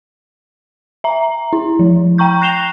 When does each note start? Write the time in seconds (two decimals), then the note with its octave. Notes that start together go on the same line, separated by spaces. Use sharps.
1.04 E5 A#5
1.53 E4
1.79 F3
2.18 G5 A#5 C#6 G6
2.41 F#6 A#6 C7 E7 F7 G7